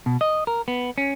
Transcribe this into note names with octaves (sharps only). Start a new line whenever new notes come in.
B2
D#5
A#4
B3
C#4